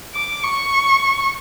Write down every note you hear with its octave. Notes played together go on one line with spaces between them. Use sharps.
D6
C#6